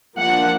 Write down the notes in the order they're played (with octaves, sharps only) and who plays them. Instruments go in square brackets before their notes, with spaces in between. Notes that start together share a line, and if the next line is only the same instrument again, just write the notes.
[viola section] F3 A#3 D4 F#5